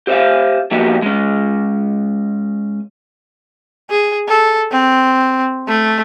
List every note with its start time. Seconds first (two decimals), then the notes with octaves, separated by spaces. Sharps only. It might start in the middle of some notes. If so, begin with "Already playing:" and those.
0.07 G4 C5 C#5 E5 F5
0.71 F3 A#3 B3 F#4 G4
1.02 G#3 C#4
3.90 G#4
4.28 A4
4.71 C4
5.68 A3